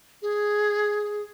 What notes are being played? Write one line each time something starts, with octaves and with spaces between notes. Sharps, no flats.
G#4